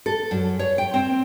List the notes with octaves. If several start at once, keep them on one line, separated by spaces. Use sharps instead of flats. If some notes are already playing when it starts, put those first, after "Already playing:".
A4
F#2
C#5
G5
C4